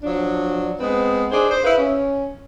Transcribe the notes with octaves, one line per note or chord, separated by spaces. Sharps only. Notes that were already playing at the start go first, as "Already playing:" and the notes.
F3 F#3 D4
G#3 B3 C4 B4
D4 D#4 G#4 C5
C5
E4 G#4 B4 F5
C#4